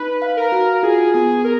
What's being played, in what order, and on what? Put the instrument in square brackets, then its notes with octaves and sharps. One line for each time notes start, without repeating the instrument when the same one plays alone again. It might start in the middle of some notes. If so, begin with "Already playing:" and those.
Already playing: [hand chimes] D#4 [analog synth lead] B4
[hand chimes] F5
[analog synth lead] A#4
[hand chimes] F#4
[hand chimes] F4 [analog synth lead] G#4
[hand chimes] B3 [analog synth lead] G#4
[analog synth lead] A#4